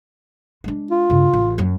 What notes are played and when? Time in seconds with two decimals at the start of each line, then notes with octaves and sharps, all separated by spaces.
0.64 G#3 D4
0.91 F4
1.10 G2 C#3
1.33 A1
1.58 F#2 F#3